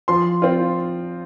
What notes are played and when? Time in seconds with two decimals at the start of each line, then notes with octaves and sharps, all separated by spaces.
0.08 F3 C6
0.42 C4 F4